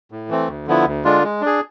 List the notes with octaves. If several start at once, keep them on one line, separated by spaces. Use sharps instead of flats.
A2
E3 A3 C4
D2
D3 F3 B3 E4
D2
D3 G#3 D4 F4
G#3
D4 G#4